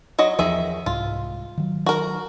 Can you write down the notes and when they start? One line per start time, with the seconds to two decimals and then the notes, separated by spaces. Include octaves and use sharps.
0.19 F#3 F#4 D#5
0.39 E2 D#3 F3 G#4 E5
0.86 C2 G#2 F4
1.57 D#3 F#3
1.86 F#4 A#4